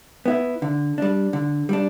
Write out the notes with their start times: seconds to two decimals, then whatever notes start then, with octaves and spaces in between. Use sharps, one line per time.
0.26 B3 E4
0.62 D3
0.98 G3 D4
1.33 D3
1.69 G3 D4